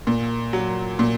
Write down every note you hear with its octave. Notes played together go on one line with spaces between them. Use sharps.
A#2
F#3
A#2